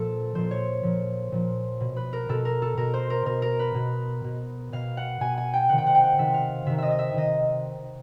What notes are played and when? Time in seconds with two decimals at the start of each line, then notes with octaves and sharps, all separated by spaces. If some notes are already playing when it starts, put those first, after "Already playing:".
Already playing: A#2 F3 A4
0.35 A#2 F3 C5
0.51 C#5
0.83 A#2 F3
1.32 A#2 F3
1.80 B2
1.96 B4
2.13 A#4
2.29 B2 A4
2.45 A#4
2.62 A4
2.77 B2 A#4
2.94 C5
3.10 A#4
3.26 B2 A#4
3.42 A#4
3.59 B4
3.75 B2
4.24 B2
4.72 B2 F5
4.97 F#5
5.20 B2 G#5
5.37 G#5
5.53 G5
5.69 C3 D#3 F#5
5.78 G5
5.86 F#5
5.95 G5
6.04 F#5
6.19 C3 D#3 E5
6.34 F5
6.66 C3 D#3 E5
6.78 D#5 E5
6.90 D#5
6.99 E5
7.14 C3 D#3 D#5